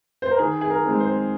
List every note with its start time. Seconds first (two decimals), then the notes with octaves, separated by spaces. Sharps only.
0.22 C5
0.31 A#4
0.39 D#3 G#4
0.61 G#4
0.70 A#4
0.85 G#3 C4 D#4
1.00 C5